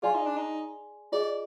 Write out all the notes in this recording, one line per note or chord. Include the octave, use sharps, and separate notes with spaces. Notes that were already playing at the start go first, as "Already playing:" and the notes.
F4 G#4 D5 G#5 C6
D#4
D4
D#4
F4 G#4 D5 D#5